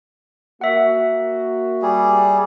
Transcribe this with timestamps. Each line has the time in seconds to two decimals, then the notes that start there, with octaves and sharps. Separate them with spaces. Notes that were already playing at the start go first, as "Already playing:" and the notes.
0.61 A#3 F#4 E5 F#5
1.82 G3 G#4